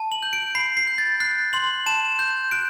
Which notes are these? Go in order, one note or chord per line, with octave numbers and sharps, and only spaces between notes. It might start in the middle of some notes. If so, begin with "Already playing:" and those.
Already playing: A5
F#7
G6
D7
B5 C7
C7
G6
A6
F#6 C7
C6 F#7
A5 E7
G6
F#6 D7